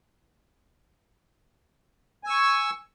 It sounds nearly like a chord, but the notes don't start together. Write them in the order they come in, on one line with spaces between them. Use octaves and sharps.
G#5 E6 C#6